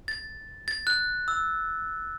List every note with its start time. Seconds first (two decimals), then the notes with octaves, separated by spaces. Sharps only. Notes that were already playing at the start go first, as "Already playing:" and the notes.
0.08 A6
0.68 A6
0.87 F#6
1.28 E6